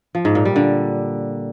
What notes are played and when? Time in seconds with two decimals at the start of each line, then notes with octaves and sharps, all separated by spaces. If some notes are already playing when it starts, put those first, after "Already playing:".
0.15 F3
0.25 G#2
0.35 A#2
0.45 G3
0.56 D3